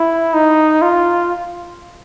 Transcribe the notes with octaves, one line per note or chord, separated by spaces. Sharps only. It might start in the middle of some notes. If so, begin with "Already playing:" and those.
Already playing: E4
D#4
F4